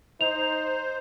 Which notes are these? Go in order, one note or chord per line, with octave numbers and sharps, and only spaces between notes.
D#4 C5 F7